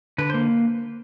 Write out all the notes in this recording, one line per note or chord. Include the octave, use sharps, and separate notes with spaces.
D3 B4
A#3 C5